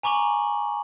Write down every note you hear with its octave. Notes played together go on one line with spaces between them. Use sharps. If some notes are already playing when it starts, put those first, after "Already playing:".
G#5 A#5 C#6 D6 F#7